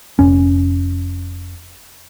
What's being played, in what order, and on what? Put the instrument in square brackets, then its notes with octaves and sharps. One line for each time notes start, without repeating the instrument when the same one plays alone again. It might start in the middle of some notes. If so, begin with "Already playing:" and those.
[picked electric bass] F1 C#4